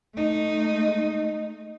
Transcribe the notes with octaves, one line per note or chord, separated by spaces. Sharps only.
A3 D#4